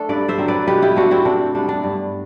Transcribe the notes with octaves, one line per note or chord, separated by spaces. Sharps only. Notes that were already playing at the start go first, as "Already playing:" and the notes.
Already playing: A3 D4 A4
G2 B4 D5
C5 E5
D3 F#3 C4
B4 D5
B2 G4 B4
E4 G4
A3 C4 D4 F#4
C4 E4
C3 D4
G3 B3 D4
D4
G2